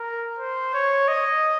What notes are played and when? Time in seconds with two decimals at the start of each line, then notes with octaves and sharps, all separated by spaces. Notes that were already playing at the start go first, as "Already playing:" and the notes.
Already playing: A#4
0.39 C5
0.74 C#5
1.08 D#5